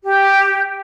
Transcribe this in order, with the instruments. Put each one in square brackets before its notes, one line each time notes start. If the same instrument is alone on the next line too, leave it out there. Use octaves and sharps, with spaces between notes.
[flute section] G4